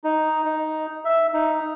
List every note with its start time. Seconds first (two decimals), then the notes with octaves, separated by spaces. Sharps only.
0.04 D#4
0.45 D#4
1.05 E5
1.34 D#4